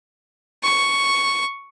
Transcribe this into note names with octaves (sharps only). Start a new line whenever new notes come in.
C#6